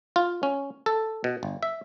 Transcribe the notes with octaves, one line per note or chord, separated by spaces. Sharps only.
F4
C#4
A4
B2
G1
E5